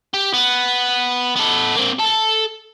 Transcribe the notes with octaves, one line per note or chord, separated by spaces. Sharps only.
G4
B3
B3 A4
A#3 C4
A4 A5